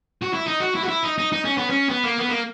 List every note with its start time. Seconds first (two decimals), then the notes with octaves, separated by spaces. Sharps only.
0.22 F#4
0.33 E4
0.46 D#4
0.60 F#4
0.75 E4
0.84 F#4
0.88 E4
1.03 D#4
1.18 D#4
1.32 D#4
1.45 C#4
1.58 B3
1.70 C#4
1.89 B3
2.04 A#3
2.18 B3
2.29 A#3